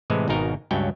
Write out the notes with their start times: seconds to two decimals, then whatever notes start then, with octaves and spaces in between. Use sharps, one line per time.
0.10 A2 C3 E3 G#3
0.28 G#1 G#2 B2 D#4 A#4
0.71 C#2 G2 F#3 C#4 D4 G5